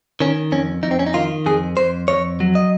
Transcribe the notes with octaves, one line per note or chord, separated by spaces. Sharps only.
D#3 C#4
F2 C#4
F2 D#4
C4
C#4
D#4
D#3 F4
F2 G#4
F2 C5
F2 C#5
F#3
D#5